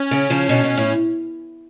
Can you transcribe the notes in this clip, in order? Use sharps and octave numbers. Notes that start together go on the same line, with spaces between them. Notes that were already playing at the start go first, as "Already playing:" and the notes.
Already playing: C#4
C#3
C#3 F3
B2 D3
B2
A2